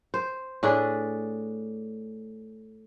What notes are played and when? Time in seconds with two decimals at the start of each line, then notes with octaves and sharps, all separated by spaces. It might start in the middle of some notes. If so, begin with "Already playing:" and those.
0.14 C5
0.63 A2 D4 G#4 B4